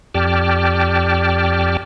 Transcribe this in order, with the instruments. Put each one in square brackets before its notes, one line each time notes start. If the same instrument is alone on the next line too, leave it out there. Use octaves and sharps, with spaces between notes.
[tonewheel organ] F2 G4 D5 G5 A5 F6